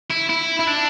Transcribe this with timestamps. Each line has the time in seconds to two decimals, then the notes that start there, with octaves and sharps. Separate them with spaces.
0.10 E4
0.29 E4
0.60 E4
0.67 D4